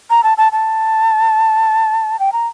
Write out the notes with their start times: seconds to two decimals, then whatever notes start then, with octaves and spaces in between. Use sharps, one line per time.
0.10 A#5
0.24 A5
0.38 A5
0.52 A5
2.19 G5
2.33 A#5